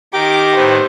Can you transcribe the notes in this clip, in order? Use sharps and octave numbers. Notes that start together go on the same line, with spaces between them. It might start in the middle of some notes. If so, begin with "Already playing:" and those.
D#3 G4 A#4 D6
A2 D#3 B3 C5